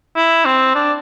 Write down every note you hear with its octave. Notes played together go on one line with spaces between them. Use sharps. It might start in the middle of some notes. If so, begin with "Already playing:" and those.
E4
C4
D4